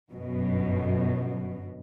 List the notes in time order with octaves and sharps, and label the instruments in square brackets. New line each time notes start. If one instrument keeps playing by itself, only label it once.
[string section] G1 F#2 B2